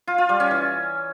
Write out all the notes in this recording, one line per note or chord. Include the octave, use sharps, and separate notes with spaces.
F4
F4
G3
C#4
E3